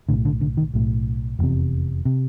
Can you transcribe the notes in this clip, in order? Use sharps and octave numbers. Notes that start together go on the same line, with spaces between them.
B1 A2 D3
D3
D3
D#3
B1 A2
F1 E2 C3
C3